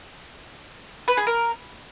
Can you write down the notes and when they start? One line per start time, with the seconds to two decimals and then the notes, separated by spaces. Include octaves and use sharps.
1.08 B4
1.17 G#4
1.27 A#4